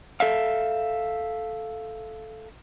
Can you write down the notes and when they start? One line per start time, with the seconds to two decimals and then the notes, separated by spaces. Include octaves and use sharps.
0.20 A4 E5 F5